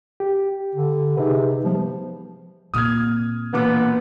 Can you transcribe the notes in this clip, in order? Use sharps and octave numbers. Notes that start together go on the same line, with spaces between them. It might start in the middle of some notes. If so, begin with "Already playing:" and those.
G4
D3
C3 D#4 G#4 B4
F3 G3 G#3 B3
A#2 C4 D#6 F6 G#6
E1 A#2 B3 D6